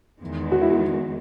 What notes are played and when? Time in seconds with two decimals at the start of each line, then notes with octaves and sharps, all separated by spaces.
0.21 E2 D#3 G#3
0.52 F#4
0.61 E4
0.71 F#4